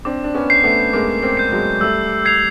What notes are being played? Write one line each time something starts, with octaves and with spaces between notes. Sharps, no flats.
C4 D4 D6
D4
B3 C#4
G6 C7
A3 B3
G#3 A#3 D6
A#3 C4
G6 C7
F#3 G#3
G3 A3 E6
G#6 C7 F7